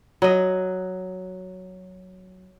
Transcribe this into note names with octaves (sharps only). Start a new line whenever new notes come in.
F#3 D#5